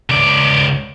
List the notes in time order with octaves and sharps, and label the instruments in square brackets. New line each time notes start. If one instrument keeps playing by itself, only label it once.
[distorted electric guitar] C#2 D5